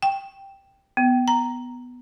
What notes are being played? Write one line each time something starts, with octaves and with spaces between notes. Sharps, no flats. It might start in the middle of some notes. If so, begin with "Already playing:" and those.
G5
B3
A#5